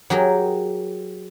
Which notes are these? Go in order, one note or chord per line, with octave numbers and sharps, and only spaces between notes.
F#3 G4 G#4 A#4